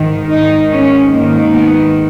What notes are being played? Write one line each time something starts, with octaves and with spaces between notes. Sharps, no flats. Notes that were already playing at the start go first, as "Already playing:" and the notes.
Already playing: G#2 D#3
G#2 D#3 D#4
C#4
G#2 D#3 A#3
B3